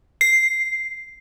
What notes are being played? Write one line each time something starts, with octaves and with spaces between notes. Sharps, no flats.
C7